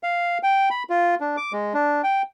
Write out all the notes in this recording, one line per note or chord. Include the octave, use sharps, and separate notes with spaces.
F5
G5
B5
F4
D4
D6
G#3
D4
G5